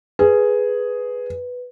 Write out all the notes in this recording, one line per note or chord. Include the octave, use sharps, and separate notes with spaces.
G#4 B4